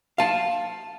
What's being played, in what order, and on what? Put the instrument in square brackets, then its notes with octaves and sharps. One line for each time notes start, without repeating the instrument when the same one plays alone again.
[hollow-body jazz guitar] F5 A5